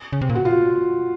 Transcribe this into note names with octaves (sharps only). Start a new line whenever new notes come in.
C#3
C3
A#2
F#4
F4